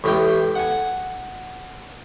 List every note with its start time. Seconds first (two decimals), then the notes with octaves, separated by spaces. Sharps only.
0.04 A1 A2 G#3 G5 D6
0.56 F#5 G#5